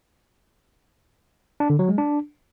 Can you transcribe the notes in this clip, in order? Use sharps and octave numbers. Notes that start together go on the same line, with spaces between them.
D4
D3
F#3
G#3
D4